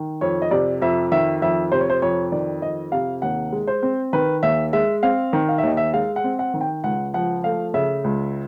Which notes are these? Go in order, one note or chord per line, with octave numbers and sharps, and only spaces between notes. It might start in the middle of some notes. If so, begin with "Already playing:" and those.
Already playing: D#3
F2 C#5
D#5
C3 D5
F2 E5
D#3 E5
F2 E5
C3 C5
C#5
C5
F2 C#5
D#3 D5
F2 D#5
C3 F5
D#2 F#5
G#3
C5
C4
D#3 B4
D#2 E5
G#3 E5
C4 F5
D#3
F5
E5
D#2 D#5
E5
G#3 F5
F#5
C4
F#5
D#3
G5
C#2 F#5
F3 F#5
A3 F5
C#3 E5
C#2